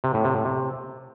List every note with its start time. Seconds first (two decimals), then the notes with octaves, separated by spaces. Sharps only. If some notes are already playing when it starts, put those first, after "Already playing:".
0.04 C3
0.14 A2
0.25 C3
0.35 A2
0.45 C3